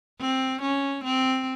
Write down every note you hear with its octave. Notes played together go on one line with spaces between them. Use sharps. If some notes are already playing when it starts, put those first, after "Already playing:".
C4
C#4
C4